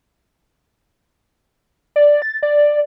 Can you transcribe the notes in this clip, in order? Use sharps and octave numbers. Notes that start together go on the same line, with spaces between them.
D5
A6
D5